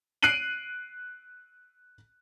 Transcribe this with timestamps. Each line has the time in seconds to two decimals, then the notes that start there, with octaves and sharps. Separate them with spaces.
0.23 F#6 C7 D7 D#7 F#7